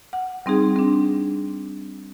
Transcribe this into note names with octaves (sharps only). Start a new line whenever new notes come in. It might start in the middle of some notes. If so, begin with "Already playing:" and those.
F#5
G3 C4 D#4 G#4
C4 D4